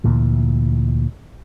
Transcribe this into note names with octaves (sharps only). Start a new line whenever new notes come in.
D2 A#2 E3